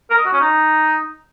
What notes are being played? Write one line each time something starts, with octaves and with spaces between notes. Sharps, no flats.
A#4
D#5
F#4
C#4
D#4